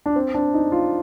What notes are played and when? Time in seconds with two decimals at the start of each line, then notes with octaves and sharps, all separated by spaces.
0.06 D4
0.16 C4
0.34 D4
0.54 D#4
0.72 F4